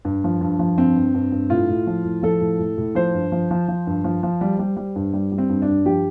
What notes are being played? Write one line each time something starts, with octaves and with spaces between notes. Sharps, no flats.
G2
F3
G2
F3
G2 C4
G2
G2
G2
A2 F4
A2
F3
A2
F3 A4
A2
A2
A2
F3 C5
G2
F3
F3
F3
G2
F3
F3
G3
G3
G3
G2
G3
G3
C4
G2
D4
G2
F3 G4